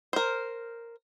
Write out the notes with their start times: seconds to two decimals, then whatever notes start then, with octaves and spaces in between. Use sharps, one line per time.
0.13 A#4 C5